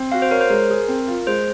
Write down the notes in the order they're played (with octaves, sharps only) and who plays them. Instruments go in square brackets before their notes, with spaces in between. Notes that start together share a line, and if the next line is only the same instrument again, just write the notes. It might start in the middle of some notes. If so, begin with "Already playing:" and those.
Already playing: [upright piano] C4
[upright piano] F#4 [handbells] F5
[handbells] C5
[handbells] A#4 [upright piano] C#5
[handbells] C5
[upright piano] G#3 [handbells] A#4
[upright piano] G#4
C4
F4
[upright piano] G#3 [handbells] C5